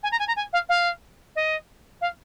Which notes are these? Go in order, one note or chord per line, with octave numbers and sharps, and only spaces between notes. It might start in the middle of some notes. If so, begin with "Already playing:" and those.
G#5
A#5
G#5
A#5
G#5
F5
F5
D#5
F5